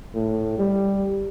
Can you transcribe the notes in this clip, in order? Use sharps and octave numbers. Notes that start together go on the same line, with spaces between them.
A2
G3